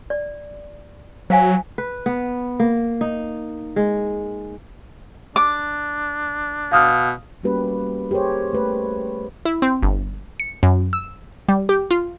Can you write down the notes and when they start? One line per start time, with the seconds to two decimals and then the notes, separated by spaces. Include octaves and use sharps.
0.10 D5
1.30 F#3 C5 F5 G#5
1.78 B4
2.06 B3
2.60 A#3
3.01 D#4
3.76 G#3
5.36 D4 D6
6.72 B2 F5 D#6 F6
7.43 G3 A#3 C#4 F#4 G4 B4
8.11 G4 G#4 A#4 C5 C#5
8.53 A3 B4
9.45 E4
9.62 C4
9.83 G1
10.40 C#7
10.63 F#2
10.93 E6
11.49 G3
11.69 G4
11.91 F4